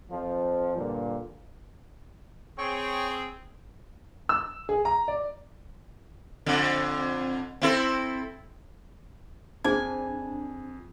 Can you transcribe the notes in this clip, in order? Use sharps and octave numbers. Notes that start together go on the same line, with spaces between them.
F2 F3
G2 A#2 D3
C4 G#4 C#5 G5 C#6
E6
G#4
A#5
D5
F2 D3
C4 E4 A4
F2 D4 G#4 C5 G#5 A5